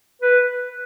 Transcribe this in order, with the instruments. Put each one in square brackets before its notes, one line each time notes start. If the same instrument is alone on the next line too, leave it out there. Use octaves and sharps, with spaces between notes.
[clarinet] B4